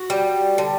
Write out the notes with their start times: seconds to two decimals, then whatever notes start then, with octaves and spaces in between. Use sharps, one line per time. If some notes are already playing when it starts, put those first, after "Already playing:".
Already playing: F#4
0.10 G3
0.58 D3